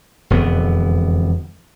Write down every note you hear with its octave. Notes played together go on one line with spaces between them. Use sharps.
E1 F2 D3 B3